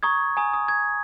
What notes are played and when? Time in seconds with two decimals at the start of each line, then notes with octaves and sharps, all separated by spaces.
0.03 A#5 C#6 D#6 G#6
0.37 G#5 A#5 D#6
0.53 D#6
0.68 G#6